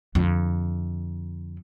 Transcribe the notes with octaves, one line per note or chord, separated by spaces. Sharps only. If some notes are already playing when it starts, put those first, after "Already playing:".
F2 D3